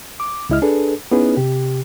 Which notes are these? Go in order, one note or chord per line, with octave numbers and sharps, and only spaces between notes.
D6
C#2 G#3 E4 D#5 F6
D4 G#4 A4 B4
B3 C#4 D#4 E4 G#4 B4
C3 G4